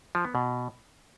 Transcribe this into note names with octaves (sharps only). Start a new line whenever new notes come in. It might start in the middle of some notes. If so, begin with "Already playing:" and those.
F3
B3
B2